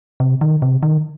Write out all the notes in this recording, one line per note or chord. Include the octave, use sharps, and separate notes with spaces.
C3
D#3
C3
D#3